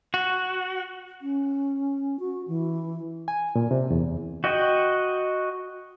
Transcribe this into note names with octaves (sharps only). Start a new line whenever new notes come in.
F#4
C#4
F#4
E3
G#5
A#2
C3
E2
F#4 D#5 G5